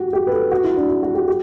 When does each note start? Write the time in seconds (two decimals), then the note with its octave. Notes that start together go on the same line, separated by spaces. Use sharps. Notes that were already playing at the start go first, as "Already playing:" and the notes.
Already playing: F#4 G4
0.13 G4
0.27 B4
0.32 A4
0.51 F#4
0.64 E4
0.76 D4
0.89 F#4
1.03 F#4
1.15 G4
1.27 G4